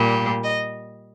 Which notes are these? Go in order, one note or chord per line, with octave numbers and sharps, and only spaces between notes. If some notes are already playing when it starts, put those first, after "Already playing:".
Already playing: A#2 G3
D#5